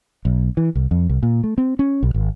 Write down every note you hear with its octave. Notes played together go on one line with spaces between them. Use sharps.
B1
E3
C2
F2
C2
A#2
A3
C4
C#4
B1
G#1